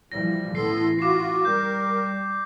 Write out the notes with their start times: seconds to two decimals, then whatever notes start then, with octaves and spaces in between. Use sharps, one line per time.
0.12 E3 F3 G3 A#6
0.55 A1 E3 B3 A4 C6 C7
0.99 F4 F#4 D6 C7
1.45 G3 A#4 G6